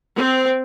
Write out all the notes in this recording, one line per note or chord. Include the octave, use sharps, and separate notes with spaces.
C4